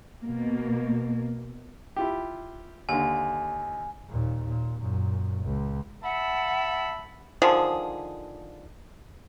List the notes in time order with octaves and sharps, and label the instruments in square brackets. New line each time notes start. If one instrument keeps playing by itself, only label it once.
[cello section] B2 A#3
[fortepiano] E4 F4 G4
[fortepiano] D#2 D3 [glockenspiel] G#5
[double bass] D#2 A#2
A#2
F#2 A#2
C#2
[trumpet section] E5 A5 B5 [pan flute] F#5
[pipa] D3 D#3 F3 G#4